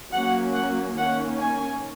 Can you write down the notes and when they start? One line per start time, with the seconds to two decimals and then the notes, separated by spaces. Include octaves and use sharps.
0.13 F#3 A#3 C#4 F#5
0.55 F#5
0.98 D#3 A#3 C#4 F#5
1.40 G#5